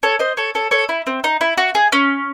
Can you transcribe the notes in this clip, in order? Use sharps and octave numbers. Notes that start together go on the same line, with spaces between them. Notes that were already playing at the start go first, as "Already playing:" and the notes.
A4 C#5
C5 D#5
A4 C#5
A4 C#5
A4 C#5
E4
C4
D#4
E4
F#4
G#4
C#4